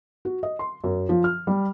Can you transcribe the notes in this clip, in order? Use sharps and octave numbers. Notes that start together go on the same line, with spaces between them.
F#4
D#5
C6
F#2
F3
F6
G3